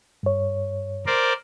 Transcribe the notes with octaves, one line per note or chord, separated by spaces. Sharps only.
G2 C#5
A#4 C5 D5